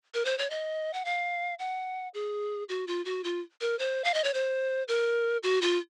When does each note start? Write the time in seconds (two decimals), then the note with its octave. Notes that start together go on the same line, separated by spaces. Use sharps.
0.14 A#4
0.25 C5
0.38 C#5
0.50 D#5
0.93 F#5
1.05 F5
1.59 F#5
2.14 G#4
2.69 F#4
2.87 F4
3.05 F#4
3.24 F4
3.61 A#4
3.79 C5
4.04 F5
4.14 D#5
4.24 C#5
4.34 C5
4.88 A#4
5.43 F#4
5.62 F4